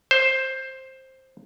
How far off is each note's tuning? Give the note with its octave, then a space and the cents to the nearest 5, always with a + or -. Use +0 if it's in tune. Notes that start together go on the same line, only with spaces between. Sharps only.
C5 +10